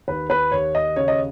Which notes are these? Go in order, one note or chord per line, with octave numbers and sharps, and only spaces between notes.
D#2 B4
B4
D#2 C#5
D#5
C#3 C#5
D#5